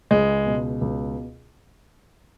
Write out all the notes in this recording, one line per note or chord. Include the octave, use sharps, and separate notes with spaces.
C#2 G#3
B2
C#2